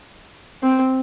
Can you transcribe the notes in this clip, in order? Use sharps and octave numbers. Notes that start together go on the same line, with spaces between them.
C4